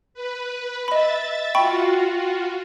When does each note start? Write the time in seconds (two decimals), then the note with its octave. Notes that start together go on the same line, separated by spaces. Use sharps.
0.14 B4
0.88 D#5 E5 B5 A6
1.55 F4 F#4 G5 B5 C#6